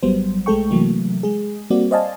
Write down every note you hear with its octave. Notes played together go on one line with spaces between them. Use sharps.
G#1 F#3 G3 B3 C5
B1 G#3 A3 A4 G5 C#6
C3 E3 F#3 A3 A#3
G#3 G#4
G3 A#3 C4 F#4 D5
C5 D5 D#5 F5 G#5 A5